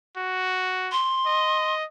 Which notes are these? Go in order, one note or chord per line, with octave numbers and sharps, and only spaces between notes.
F#4
C6
D#5